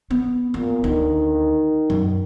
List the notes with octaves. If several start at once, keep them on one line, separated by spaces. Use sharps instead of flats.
B3
A#2 B3
D2 D#3
F#2